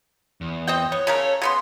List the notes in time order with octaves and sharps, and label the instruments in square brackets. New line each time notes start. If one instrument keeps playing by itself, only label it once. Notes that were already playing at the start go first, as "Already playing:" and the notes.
[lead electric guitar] E2
[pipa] C4 D#5 G5
[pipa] B3 [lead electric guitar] C#5
[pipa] C#3 A3 A#4
C#3 B3 C6